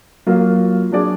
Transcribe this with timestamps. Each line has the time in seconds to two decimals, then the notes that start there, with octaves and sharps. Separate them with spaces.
0.26 F#3 A#3 F4
0.92 F#3 D4 G#4 D5